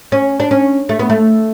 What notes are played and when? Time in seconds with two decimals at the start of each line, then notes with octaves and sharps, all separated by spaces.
0.12 C#4
0.40 D4
0.51 C#4
0.89 A3
0.99 B3
1.09 A3